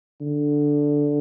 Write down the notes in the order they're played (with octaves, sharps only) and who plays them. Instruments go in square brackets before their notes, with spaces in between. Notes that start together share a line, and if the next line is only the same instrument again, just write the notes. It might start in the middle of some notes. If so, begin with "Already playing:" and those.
[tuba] D3